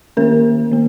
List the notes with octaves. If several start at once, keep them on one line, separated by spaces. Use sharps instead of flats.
D#3 A#3 C#4 A#4
D#3 A#3